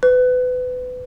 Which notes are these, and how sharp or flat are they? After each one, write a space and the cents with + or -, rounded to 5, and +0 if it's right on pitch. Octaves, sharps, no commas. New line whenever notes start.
B4 +30